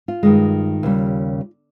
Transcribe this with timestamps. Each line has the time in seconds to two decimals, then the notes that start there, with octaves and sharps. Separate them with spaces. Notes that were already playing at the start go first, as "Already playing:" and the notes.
0.08 F4
0.23 G2 D#3 G#3
0.83 D#2 C#3 G3